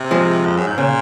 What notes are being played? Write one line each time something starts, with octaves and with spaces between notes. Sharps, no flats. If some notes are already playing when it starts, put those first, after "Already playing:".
Already playing: C3
F3 G#3
F2
F#2
G#2
A#2 C#3